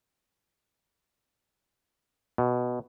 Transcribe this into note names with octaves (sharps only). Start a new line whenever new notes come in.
B2